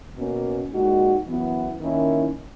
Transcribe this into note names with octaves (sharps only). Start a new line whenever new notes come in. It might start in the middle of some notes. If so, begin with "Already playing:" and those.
B2 A#3 C#4
A#2 G#3 D#4 F#4
F#2 E3 B3 E4
D#3 A#3 C#4 E4